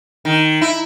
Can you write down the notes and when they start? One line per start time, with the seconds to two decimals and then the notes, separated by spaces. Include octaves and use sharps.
0.25 D#3
0.61 E4